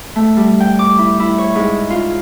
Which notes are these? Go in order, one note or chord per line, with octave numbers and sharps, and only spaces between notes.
A3
G3
G5
D6
E4
E4
C#5
G#2
F4